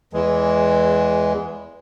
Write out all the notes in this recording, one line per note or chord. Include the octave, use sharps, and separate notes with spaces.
E2 E3 G#3